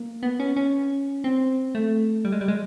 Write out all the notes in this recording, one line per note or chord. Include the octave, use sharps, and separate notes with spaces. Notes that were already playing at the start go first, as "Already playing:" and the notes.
Already playing: A#3
B3
C#4
C#4
C4
A3
G3
G#3
G3
G#3